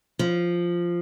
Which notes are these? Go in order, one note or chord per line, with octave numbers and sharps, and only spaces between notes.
F3